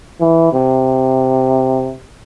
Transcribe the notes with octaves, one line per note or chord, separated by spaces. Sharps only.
E3
C3